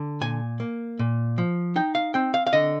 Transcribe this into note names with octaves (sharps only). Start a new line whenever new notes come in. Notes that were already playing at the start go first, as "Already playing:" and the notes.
Already playing: D3
A#2 G#5
A#3
A#2
F3
D#4 G5
F5
C4 G5
F5
F5
D3 D#5